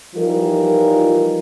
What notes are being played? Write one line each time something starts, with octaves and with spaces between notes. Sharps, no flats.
E3 F3 G3 D#4 F4 A#4